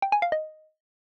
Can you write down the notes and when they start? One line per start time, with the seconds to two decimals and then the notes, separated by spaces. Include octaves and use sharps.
0.02 G5
0.12 G#5
0.22 F5
0.32 D#5